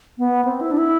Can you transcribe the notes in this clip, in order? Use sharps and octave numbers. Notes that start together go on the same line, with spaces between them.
B3
C4
E4
D4
E4